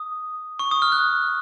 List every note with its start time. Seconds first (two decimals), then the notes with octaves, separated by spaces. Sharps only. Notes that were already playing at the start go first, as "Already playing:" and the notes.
Already playing: D#6
0.59 C#6
0.71 D#6
0.82 F6
0.92 F#6